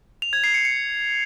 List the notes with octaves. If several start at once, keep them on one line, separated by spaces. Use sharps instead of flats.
F7
G#6
C7
C#7
C#7